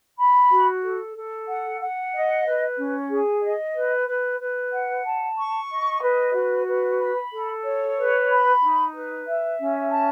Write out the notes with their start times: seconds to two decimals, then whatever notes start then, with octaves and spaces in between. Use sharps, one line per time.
0.17 B5
0.50 F#4
0.82 A4
1.15 A4
1.47 F#5
1.80 F#5
2.12 D#5
2.45 B4
2.77 C#4
3.09 G#4
3.42 D#5
3.73 B4
4.07 B4
4.39 B4
4.71 F#5
5.04 A5
5.37 C#6
5.69 D#5
6.02 B4
6.33 F#4
6.66 B4
6.98 B5
7.31 A4
7.64 C#5
7.96 B4
8.29 B5
8.61 D#4
8.93 B4
9.26 E5
9.59 C#4
9.90 A5